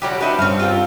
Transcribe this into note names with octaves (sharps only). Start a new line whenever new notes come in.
D3 F#3 G3 C#4 F#4 G4
A3 D4 D#4 F#4 B4
G2 C4 C#4 C#5 F5
F4 G4 A4